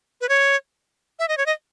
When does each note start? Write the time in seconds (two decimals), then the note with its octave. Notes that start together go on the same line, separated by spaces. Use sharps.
0.21 B4
0.29 C#5
1.19 E5
1.28 D#5
1.38 C#5
1.46 D#5